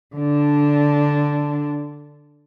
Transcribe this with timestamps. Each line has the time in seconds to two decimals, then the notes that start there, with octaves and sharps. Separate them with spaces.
0.16 D3 D4